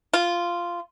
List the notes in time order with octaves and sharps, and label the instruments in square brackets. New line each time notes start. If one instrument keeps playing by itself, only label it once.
[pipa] F4